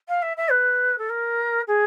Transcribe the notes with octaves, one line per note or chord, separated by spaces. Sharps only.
F5
E5
E5
B4
A4
A#4
G#4